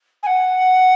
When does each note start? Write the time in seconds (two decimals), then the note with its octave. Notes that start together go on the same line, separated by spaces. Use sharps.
0.23 G#5
0.26 F#5